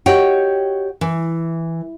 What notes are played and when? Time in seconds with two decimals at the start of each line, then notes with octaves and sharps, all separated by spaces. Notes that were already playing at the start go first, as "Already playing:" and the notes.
0.06 F#4 G4 C#5 D#5 F#5 G5
1.01 E3